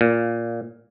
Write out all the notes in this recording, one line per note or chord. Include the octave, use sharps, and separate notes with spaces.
A#2